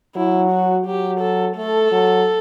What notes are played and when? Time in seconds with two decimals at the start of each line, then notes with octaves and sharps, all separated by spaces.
0.16 F#3 E4
0.51 F#4
0.86 F#3 G4
1.20 A4
1.56 A3 A4
1.91 F#3